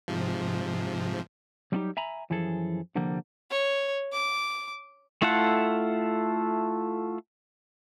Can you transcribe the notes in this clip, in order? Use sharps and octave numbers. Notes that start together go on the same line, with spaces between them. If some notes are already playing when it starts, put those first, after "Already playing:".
G#2 C3 F3
F#3 G3 C4 D4 D#4 G4
E5 G#5 A#5 B5
F#2 E3 F3 G#4 A4
C2 D3 F3 G3 A#3
C#5
D6
A3 E4 F4 A4 F#5